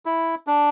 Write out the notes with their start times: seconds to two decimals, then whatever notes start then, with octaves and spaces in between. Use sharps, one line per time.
0.06 E4
0.47 D4